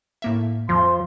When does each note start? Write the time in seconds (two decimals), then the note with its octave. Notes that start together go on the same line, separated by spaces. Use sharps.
0.22 A2 A#3 E5
0.69 F2 F3 C6